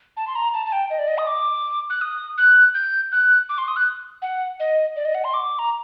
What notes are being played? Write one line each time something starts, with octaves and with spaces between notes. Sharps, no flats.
A5
C6
A#5
A5
A5
G5
D#5
D5
D#5
D#6
D6
F#6
D#6
F#6
G6
F#6
D6
C6
D#6
F#6
F#5
D#5
D5
D#5
F#5
C6
D6
A#5